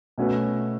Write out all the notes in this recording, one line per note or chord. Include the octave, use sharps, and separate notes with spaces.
B2 A3 C#4 F#4 B4